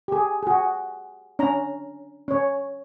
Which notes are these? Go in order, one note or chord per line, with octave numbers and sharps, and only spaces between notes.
G4 G#4
F#4 G#4
C#4 D4 A#5
C#4 C#5